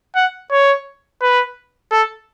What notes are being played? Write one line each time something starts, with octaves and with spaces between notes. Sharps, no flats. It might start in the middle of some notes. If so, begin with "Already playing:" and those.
F#5
C#5
B4
A4